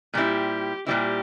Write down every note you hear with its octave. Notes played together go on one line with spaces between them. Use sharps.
A#2 G3 C4 E4 G4
A#2 G3 C4 E4 G4